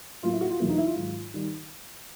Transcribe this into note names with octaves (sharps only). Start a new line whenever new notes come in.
A2 F#3 A#3 F4
E4
F#4
F4
E2 B2 F#3 A#3 E4
D#4
E4
F4
G#2 D#3 F#3
D#3 G3